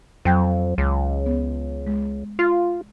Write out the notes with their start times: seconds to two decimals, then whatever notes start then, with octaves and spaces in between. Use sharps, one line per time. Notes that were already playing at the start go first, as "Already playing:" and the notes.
0.25 F2 F#3 G5 G6
0.78 C#2
1.26 B3
1.87 G#3
2.39 F4